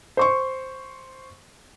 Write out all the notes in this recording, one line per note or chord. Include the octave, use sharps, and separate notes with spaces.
C5 C6 C#6